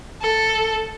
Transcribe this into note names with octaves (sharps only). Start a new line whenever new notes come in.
A4